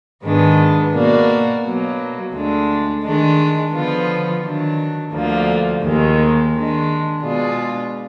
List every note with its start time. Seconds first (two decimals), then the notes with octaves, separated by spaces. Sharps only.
0.24 G#2 D#3 G#3 B3 D4
0.94 B2 A#3 D4 F#4
1.64 B2 F#3 A#3
2.33 D2 D3 G#3 D4
3.03 D#3 G#3 D4
3.73 D3 F3 B3 F4
4.43 D#3 F#3 D4
5.13 D2 D3 F3 A#3
5.83 D#2 D#3 G#3
6.52 D#3 G#3 D4
7.22 B2 G#3 D4 F4